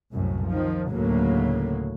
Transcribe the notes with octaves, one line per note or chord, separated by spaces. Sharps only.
C2 F#2 A2
D#3 F3
D2 A2 C#3 F#3 A#3